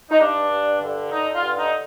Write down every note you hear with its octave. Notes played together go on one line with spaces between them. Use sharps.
D#4
G2 D4
G2
D3
D3 D#4
F4
G2
D#4